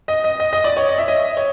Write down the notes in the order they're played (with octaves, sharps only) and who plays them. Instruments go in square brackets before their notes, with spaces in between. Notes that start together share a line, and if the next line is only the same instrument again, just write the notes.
[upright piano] D#5
D#5
D#5
D#5
D5
C#5
D#5
E5
D#5
C#5